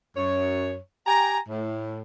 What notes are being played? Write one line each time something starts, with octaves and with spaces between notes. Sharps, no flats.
F#2 C#5
G4 G5 G#5 A#5
A2